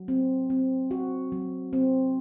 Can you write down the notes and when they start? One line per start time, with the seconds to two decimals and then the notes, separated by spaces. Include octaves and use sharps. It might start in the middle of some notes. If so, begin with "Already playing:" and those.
Already playing: F#3
0.08 C4
0.50 C4
0.91 F#4
1.32 F#3
1.73 C4